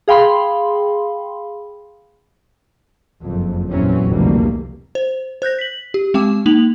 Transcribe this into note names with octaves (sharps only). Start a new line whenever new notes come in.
G#4 F5 G5 B5 C6
F#1 F2
A#1 E2 E3 F#3 C4 C#4
F1 C2 B2 D3 G3 A#3
C5
C5 F#6 G6 A#6
B6 F#7
G4
G#3 C4 G5 D6 E7
A#3 D#4 F7 F#7